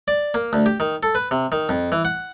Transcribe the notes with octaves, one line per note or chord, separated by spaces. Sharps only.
D5
A#3
D2
G4
D#3
A4
B4
C3
D#3
F2
E3
F#5